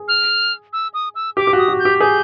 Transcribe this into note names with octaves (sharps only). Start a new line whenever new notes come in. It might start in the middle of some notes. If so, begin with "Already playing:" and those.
Already playing: G#4
F6
E6
D#6
E6
G4 D6
G4
F#4
D#6
F#4
G6
G4
G#4 G6